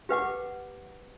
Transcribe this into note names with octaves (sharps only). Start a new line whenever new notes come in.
G4 B4 F#5 D6